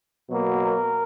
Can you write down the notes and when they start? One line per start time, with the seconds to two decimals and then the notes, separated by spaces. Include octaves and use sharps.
0.28 B2 F#3 A#3
0.63 A#4